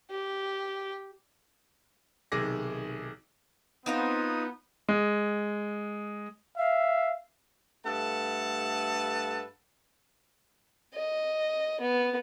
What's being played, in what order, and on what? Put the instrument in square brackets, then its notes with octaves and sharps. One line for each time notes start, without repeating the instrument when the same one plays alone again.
[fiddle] G4
[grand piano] B1 C3 D#3 G#4 D6 A#6
[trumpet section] B3 [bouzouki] C4 F4 A#4 [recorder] D#4 [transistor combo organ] D#6
[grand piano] G#3
[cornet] E5 [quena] F5
[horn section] G2 A3 A4 B4 F#5 A5
[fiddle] D#5
B3